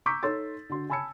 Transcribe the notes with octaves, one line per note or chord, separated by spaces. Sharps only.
A#5 C#6 D6 E6 G6 B6
D#4 A4 C#5 C6 E6 A6
D3 F#4 C6
G#5 A5 B5 E6 G#6 C#7